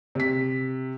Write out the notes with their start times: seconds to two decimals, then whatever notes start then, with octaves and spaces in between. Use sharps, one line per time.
0.15 C3 B6